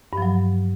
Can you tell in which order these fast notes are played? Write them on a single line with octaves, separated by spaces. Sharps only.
G2 F3 F#3